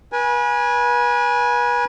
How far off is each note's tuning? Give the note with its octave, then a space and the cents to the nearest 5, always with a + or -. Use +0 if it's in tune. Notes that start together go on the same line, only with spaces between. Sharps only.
B4 -35 G#5 +0